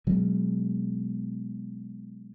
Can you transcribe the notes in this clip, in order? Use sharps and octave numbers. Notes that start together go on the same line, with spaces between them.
B2 F#3 G#3